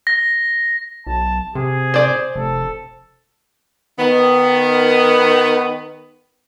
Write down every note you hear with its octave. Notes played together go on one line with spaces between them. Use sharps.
A#6
B1 A5
C3 G#4
C5 D5
F1 A4
D#3 B3